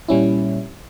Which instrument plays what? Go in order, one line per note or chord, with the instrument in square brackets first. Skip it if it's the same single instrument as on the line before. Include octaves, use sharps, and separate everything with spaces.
[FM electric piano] A#2 G3 C#4 E4